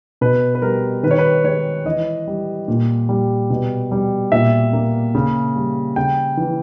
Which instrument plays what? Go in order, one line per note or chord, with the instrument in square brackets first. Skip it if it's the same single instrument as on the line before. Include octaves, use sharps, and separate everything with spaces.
[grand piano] B2 B4
B4
G3 A#4
D#3 B4
C#5
B4
G#3 C#5
E3 D#5
G3
A#2
G3
B2
G3
A#2 E5
A#3
C#3
G3
C#3 G5
E3